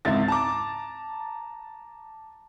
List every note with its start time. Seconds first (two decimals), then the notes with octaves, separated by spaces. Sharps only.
0.05 G#1 C#2 G#2 E4 A6
0.28 A5 A#5 D6